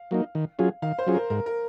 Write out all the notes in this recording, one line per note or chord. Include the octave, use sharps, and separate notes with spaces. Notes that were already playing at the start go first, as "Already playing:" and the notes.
Already playing: F5
F#3 A#3 D#4
D#3
F#3 C#4 F4 G#4
D#3 F5
C5
F#3 C#4 F4 G#4
A#4
G#2 A#4
A#4